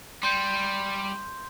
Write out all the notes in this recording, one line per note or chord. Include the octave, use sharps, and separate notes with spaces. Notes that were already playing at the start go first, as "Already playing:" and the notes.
G3 C6 G6